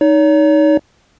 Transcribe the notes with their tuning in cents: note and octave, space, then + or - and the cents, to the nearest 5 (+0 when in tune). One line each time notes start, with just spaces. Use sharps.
D#4 +0 C#5 +40